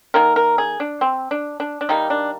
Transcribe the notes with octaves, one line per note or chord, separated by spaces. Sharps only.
D#3 A#3 A#4
A#4
G#4
D4
C4
D4
D4
D4
D#3 G3 A#3 D#4
D4